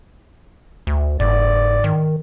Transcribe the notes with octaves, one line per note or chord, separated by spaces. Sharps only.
D2
F#1 G#2 D5
D#3